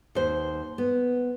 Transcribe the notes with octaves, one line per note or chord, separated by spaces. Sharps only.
D#2 C5
B3